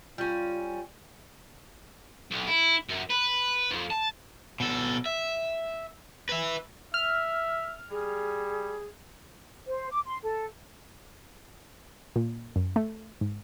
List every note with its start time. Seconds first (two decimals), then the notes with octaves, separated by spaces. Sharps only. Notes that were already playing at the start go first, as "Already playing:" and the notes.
0.18 G3 C#4 F4
2.31 B1
2.48 E4
2.89 F#2
3.10 B4
3.71 F2
3.90 A5
4.60 B2 A4
5.06 E5
6.29 B4 E5
6.94 E5 F6
7.91 G3 G#4
9.67 C5
9.90 D6
10.06 C6
10.23 A4
12.16 A#2
12.56 F#2
12.76 A3
13.21 G#2